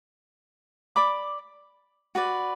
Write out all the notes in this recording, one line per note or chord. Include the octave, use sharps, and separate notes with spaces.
D5 B5 D6
F#4 B4 D5